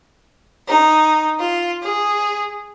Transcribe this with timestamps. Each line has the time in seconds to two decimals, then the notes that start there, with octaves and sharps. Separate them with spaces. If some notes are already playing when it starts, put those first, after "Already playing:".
0.67 D#4
1.39 F4
1.82 G#4